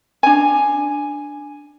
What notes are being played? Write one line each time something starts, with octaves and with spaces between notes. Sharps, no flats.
D4 G#5